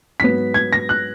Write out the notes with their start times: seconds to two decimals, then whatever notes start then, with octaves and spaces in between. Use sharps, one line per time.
0.20 G#2 F#3 B3 B6
0.54 G#6
0.73 A#6
0.89 F#6